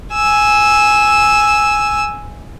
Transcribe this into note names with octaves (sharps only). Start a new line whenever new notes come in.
G#5 E6